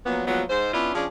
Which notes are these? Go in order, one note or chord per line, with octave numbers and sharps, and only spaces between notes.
A#2 F3 F#3 B3
A#2 F3 F#3 G#3 B3
G#2 C5
B3 C#4 D4 E4 F4
F3 C#4 D4 G#4